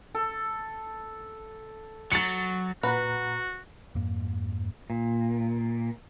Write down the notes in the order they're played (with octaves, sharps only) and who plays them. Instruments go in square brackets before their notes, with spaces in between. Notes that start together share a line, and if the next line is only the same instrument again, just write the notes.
[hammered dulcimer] A4
[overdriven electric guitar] F#3 [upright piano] A6 C#7
[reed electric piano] A#2 F#5 A#5 [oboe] F#4 [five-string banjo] B4
[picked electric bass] F2 G#2 A#3
[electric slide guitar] A#2